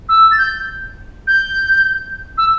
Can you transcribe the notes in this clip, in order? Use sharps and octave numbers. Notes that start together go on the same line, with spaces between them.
E6
A6
G6
G6
E6